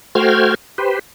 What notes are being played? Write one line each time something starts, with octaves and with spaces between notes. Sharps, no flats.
A3 F#4 C5 G5 F6 G#6
G4 B4 C5